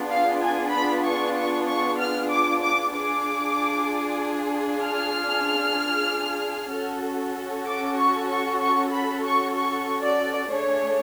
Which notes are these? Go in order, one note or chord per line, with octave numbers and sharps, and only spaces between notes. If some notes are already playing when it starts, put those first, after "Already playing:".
Already playing: B3 D4 F4 G#4
F5
G#5
B5
C#6
C#6
C#6
F6
D6
D6
D4 F4 G#4 D6
F6
C#4 F#4 A4
D6
C#6
C#6
C#6
B5
C#6
C#6
D5
A3 D4 G#4 C#5